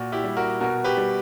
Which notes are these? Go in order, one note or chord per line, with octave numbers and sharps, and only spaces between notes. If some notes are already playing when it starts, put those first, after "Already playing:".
Already playing: A#2 F#4
E4 G4
G3
F#4 A#4
B2 F#4 A#4
G4 B4
G3